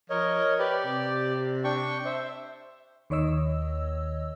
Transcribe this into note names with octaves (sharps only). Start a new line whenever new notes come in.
F3 A#4 C#5 D#5
G4 B4 D5
C3
D4 G5 C#6
C5 E5
D#2 D#3 C#5 D#5 E6